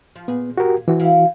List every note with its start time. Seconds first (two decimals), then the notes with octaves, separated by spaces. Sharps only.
0.16 F3
0.28 A#2 B3 G#4
0.58 F#4 G4 A#4
0.88 E3 C4 F#4
1.00 E4 F5